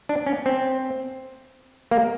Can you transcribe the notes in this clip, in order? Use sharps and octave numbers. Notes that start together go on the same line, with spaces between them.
D4
C#4
C4
A#3